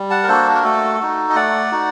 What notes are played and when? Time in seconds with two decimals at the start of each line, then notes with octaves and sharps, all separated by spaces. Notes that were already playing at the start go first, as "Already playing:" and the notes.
Already playing: G3
0.10 F#5 A5
0.23 A#4
0.28 A#3 D4 F#4 A4 C5
0.55 A#4
0.64 A3 F#4 A4
1.00 D#4 F#4
1.30 D#5
1.35 A3 D5 F#5
1.72 D#4 F#4